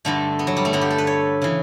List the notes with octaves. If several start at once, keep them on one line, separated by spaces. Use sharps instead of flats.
G2 D3 A3
B3
F#3
G3
A3
G2 D3 B3
G4
A4
B4
C#5
C#3 E3